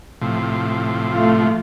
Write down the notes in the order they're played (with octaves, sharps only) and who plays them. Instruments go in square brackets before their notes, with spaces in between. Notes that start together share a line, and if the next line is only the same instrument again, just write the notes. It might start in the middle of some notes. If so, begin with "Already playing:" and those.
[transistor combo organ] A2 C3 F3
[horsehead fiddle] A3 F4